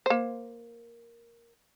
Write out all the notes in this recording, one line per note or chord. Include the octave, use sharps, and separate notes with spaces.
A#3 C5